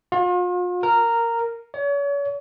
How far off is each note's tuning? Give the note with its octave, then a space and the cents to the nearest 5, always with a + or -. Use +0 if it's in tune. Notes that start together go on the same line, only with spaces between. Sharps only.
F4 +40
A#4 -10
C#5 +40